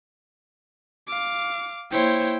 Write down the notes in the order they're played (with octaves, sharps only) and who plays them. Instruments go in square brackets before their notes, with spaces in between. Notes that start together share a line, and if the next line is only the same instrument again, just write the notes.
[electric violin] F5 D6
[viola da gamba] A#3 C5 C#5 [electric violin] E4 G5